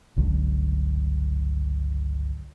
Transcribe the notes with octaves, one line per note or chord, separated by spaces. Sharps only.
G1 C#2 D3 F#3